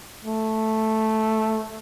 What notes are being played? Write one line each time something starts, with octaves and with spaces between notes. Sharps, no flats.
A3